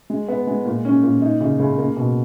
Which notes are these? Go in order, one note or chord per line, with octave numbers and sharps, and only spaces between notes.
G#3
B3
G#3
A#2
C#4
A#2
D#4
C#3
C#2
A#3
B2